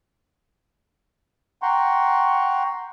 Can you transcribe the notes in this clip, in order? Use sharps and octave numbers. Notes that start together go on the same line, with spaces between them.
F#5 G5 A#5 C6 C#6